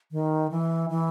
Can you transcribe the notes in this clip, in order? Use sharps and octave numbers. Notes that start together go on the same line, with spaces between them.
D#3
E3
E3